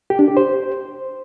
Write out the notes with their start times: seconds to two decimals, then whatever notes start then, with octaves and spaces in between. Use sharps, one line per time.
0.10 G4
0.19 D4
0.28 G4
0.37 C5